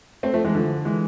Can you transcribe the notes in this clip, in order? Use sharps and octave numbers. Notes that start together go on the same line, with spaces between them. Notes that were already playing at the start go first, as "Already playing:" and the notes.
A3 C4
F3 A3
E3 G#3
D3 F3
E3 G#3